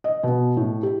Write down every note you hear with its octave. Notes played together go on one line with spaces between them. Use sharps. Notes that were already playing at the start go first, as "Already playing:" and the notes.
D#5
B2
A2
G4